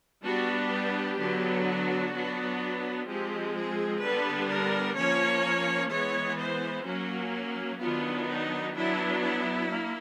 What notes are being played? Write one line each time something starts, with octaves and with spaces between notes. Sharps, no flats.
G3 B3 D4 F#4
G4
D3 F#3 B3 D4
F#4
F#3 B3 D4
F3 G#3 C4 G4
G#4
D3 G3 B3 D4 B4
A#4
F3 A#3 C#4 C#5
E3 G#3 B3 C#5
C5
F#3 A#3 C#4 F#4
D#3 F#3 B3 D4 F4
D#4
F#3 B3 D4 E4
E4
A#3